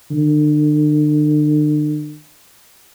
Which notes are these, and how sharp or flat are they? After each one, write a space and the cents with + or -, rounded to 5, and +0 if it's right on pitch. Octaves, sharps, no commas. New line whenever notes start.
D3 +40